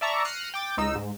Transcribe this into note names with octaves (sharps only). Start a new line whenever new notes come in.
D5 E5 A5 A#5 C#6
F6 F#6 A#6 C7 C#7 D#7
G5 D6 A6
C#2 D#4 E6
G#2